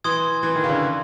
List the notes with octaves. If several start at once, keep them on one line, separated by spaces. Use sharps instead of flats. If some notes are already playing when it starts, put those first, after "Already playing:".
E3 C6 D#6 G#6
E3
D#3
C#3
D3